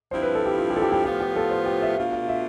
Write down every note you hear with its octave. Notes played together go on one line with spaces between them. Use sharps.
G2 F3 C4 E4 C5
B4
A4
G4
F4
G4
A4
G4
G4
A2 F3 B3 F4 G4
G4
A4
C5
G4
E5
B2 A3 D4 F4 F5
F5
E5